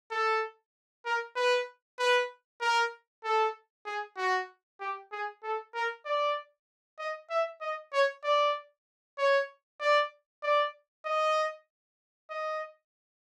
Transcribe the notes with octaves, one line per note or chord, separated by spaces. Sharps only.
A4
A#4
B4
B4
A#4
A4
G#4
F#4
G4
G#4
A4
A#4
D5
D#5
E5
D#5
C#5
D5
C#5
D5
D5
D#5
D#5